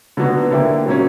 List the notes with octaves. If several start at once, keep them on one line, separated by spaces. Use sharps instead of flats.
D3 F#3 B3 F#4
D3 A#3 E4 G4
A#2 F#3 A#3 C#4